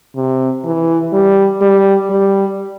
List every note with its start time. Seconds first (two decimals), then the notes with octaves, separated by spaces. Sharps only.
0.16 C3
0.65 E3
1.13 G3
1.61 G3
2.10 G3